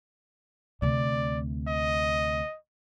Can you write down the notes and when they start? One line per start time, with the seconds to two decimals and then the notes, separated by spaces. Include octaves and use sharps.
0.82 D2 C3 D5
1.68 D#5